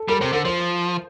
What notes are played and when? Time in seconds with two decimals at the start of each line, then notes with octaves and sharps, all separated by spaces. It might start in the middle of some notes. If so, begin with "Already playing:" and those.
Already playing: A4
0.08 G3 A#4
0.21 C3 C5
0.33 D3 A#4
0.45 F3 C5